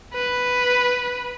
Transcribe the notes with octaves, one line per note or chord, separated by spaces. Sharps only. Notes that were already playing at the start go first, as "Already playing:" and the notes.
B4